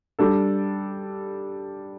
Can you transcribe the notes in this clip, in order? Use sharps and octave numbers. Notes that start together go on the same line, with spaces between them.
G3 D4 A4